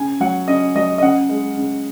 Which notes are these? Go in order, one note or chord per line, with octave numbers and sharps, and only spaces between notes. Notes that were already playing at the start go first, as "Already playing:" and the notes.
Already playing: C#3 G#5
F#3 F#5
C#3 D#5
F#3 D#5
D#5
C#3 F#5
G#3
C#3